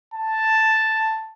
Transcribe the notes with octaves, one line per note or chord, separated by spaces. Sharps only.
A5